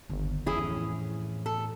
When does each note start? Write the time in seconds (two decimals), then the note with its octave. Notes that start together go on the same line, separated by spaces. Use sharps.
0.09 G1 D#2 D#3
0.46 F2 E3 C#4 E4 G#4
0.62 A2
1.46 A4